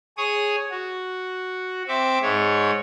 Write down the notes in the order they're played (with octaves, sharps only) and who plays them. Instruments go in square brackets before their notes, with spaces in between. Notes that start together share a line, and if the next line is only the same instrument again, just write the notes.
[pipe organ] G#4 C#5 D#6
F#4
C4 E5 D6
G#2 C#5